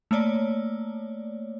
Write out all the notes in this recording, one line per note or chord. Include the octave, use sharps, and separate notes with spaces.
A3 A#3 C#5 D5